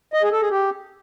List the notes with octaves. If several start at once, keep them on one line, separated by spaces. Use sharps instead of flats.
D#5
G#4
A4
G#4
G4